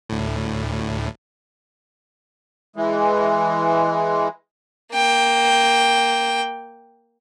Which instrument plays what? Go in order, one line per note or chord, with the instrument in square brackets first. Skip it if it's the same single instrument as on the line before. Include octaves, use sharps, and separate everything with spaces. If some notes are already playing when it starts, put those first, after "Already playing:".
[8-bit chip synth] D2 A2
[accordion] E3 G#3
[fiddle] A#3 G5